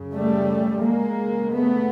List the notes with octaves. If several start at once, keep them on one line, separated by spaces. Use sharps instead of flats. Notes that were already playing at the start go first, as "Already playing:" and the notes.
Already playing: F#2 C#3
G3 A3
G#3 A#3
F#2 C#3
A3 B3